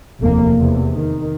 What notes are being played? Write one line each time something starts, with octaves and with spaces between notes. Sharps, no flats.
F1 D#2 A#3
E2 C3
D#3